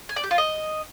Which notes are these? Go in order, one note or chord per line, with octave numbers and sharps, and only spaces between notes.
G#5
D5
G4
F4
D#5